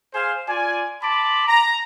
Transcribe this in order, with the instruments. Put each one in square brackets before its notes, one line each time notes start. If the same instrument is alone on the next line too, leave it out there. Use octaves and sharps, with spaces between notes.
[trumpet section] G#4 C5 F5 G#5
F4 D5 G#5
A5 B5 C6 D6
A#5